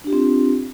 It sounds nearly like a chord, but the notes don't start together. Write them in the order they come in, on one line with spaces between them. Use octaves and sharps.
D4 G4 F4 C4